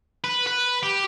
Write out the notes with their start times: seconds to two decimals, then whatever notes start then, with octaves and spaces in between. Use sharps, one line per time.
0.24 B4
0.47 B4
0.83 G4